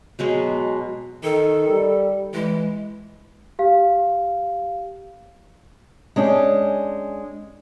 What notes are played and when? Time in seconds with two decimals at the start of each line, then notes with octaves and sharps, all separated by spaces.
0.19 B2 F#3 G#3 G#4
1.23 D#3 A4
1.69 G3
2.34 E3 G#3
3.59 G4 F5
6.16 G#3 C#4 D4 G4